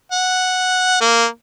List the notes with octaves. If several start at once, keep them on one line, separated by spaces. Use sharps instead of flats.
F#5
A#3